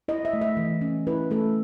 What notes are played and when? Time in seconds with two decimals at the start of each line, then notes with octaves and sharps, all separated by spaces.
0.08 E4 D#5
0.25 E5
0.33 A3
0.41 E5
0.57 E3
0.81 C#4
1.07 E4 B4
1.31 A3 A4